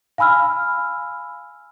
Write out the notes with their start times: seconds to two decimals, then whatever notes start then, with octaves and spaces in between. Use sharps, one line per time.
0.18 F5 G#5 B5 E6 F6